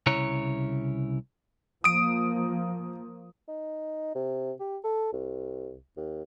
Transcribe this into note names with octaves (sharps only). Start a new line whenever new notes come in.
C2 C#3 E4 C#5 A#5
F3 A#3 D#6 D7
D#4
C3
G4
A4
C2
D#2